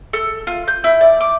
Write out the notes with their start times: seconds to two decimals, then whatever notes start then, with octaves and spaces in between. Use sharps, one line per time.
0.13 A4
0.47 F4
0.67 G6
0.84 E4
1.01 D5
1.21 D6